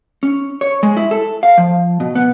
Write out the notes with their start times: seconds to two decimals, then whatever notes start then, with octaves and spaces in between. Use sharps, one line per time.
0.23 C#4
0.61 C#5
0.83 G#3
0.97 E4
1.11 A4
1.43 F5
1.58 F3
2.00 B2
2.15 B3